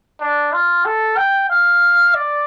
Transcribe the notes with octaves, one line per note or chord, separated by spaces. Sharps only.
D4
F4
A4
G5
F5
D5